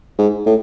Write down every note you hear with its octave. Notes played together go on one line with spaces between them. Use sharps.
G#2
A2